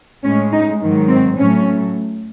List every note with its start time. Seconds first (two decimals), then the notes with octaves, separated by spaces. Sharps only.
0.24 A2 G#3 C#4
0.52 D#4
0.80 G#2 D#3 F#3
1.09 C4
1.36 A2 F#3 A3 C#4